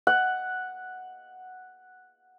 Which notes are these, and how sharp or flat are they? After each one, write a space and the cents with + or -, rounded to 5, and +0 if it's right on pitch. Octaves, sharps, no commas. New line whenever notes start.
F#5 +0